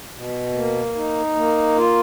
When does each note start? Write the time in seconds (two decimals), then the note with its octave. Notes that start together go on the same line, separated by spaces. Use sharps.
0.14 B2
0.54 A#3
0.95 D#4
1.36 A#3
1.77 F4